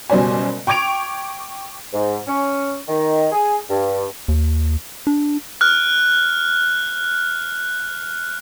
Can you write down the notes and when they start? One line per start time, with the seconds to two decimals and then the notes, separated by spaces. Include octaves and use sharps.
0.10 F#1 B2 G3 C5 D5 G#5
0.67 G5 C#6 D6 G#6 D7 F7
1.93 G#2
2.27 C#4
2.89 D#3
3.32 G#4
3.70 G2
4.28 D#2
5.07 D4
5.61 F6 F#6